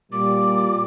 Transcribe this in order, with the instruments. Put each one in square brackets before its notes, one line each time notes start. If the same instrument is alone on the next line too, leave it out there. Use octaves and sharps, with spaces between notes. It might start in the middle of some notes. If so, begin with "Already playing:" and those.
[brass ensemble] A#2 G3 [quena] D6